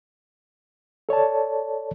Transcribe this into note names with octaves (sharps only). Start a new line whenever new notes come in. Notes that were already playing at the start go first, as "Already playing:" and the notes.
A4 C#5 D5 A5